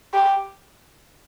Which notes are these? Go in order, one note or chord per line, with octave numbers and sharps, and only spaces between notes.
G4